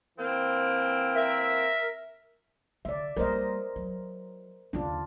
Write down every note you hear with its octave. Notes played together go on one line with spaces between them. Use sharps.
E3 A#3 C4
A#4 E5
D3 D5 E5
G3 A#3 A#4 C5 D#5
F#3
D#2 D3 D4 F4